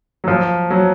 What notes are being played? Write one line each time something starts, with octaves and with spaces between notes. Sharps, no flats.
F#3
F3
F#3